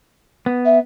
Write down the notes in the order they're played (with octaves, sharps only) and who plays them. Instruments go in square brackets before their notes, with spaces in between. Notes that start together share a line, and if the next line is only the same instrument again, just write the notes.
[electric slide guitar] B3
[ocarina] E5